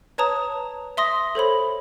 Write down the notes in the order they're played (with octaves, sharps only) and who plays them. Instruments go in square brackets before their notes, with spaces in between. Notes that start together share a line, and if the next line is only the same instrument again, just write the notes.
[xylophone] B4 C#5 A5 A#5 D#6
E5 C6 D#6 A#6
A4 C5 C#5 B5